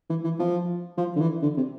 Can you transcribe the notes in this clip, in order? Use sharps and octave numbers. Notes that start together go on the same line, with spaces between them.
E3
E3
F3
F3
D3
E3
D3
C3